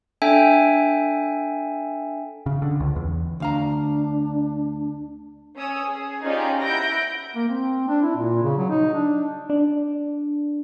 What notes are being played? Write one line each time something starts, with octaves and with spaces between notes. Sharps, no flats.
D4 A4 E5 G5 G#5
C#3
D3
C#2
E2
D2 D4 F5 A#5
C#4 C#5 D#6 E6
G#4
C#4 D#4 F4 G4 G#4 D5
E4 F#5 B5 G6 A#6 D7
A#3
C4
D4
E4
A#2
C#3
F#3
D#4
D4
D4